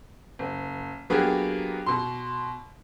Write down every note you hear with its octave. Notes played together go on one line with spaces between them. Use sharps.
F#1
F#3 A#3 B3 D4 G4 G#4
B2 C6